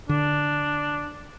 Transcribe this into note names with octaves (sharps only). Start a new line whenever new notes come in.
D3 D4